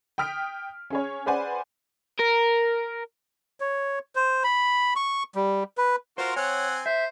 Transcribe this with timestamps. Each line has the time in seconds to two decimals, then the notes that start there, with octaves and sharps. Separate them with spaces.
0.18 G5 D#6 F6 B6 D7
0.90 C#4 G#4 C#5
1.26 G#4 B4 C5 D5 F#5 G#5
2.20 A#4
3.60 C#5
4.15 C5
4.44 B5
4.96 C#6
5.35 G3
5.78 B4
6.18 F4 F#4 A#4 C5
6.36 C4 C#5 F#5 G#5
6.86 C5 E5